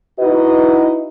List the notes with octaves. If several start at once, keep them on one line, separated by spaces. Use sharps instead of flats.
D#4 E4 F#4 B4 D#5